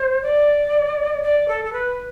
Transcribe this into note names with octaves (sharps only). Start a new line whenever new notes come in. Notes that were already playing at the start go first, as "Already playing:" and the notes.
Already playing: C5
D5
D5
A4
A4
B4